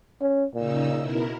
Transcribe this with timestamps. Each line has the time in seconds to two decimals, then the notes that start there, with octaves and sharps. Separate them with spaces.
0.21 C#4
0.55 A#2 C#3 D#4 E6
0.98 B2 E4 A#4